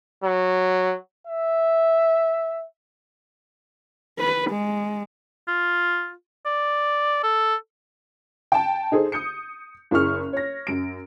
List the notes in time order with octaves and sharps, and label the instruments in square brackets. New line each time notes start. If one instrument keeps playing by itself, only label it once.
[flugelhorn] F#3
E5
[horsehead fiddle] B4
G#3
[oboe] F4
D5
A4
[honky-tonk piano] G5 A5
D#4 G#4 A4 C5
D#6 G6 C#7
F#1 E4 G#4 C#6 F6
C#5 A#6
F#2 D7